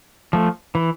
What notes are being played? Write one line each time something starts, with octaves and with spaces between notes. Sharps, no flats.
F3 A3
E3